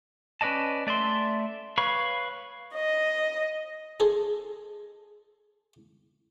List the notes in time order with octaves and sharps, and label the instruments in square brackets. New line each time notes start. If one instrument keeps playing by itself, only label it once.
[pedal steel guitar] C#4 B4 D5 D#5 A5
A3 D5 E5 C6
B4 C#5 F5 B5 C#6
[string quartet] D#5
[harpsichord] G#4 A4 C5